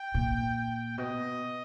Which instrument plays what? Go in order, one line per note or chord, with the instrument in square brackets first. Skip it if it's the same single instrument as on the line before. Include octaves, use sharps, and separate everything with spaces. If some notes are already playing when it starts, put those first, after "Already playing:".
Already playing: [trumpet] G5
[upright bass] A#2
[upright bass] B2 [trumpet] D#5